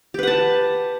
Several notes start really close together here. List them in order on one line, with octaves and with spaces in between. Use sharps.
G4 B4 F#5 A5